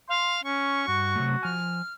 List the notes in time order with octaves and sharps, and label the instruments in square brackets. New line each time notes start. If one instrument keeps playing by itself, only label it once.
[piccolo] F5 [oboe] C6
[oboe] C#4 [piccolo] C#6
[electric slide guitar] G2 [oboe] F#4
[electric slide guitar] C3 F#3 A3
[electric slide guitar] F3 G#5 [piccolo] F6